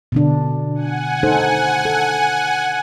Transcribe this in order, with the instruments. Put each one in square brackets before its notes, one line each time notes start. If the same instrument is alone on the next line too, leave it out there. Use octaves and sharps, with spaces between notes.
[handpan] B2 D3 D4
[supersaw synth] F#5 G#5
[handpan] D#4 A4 C5
A4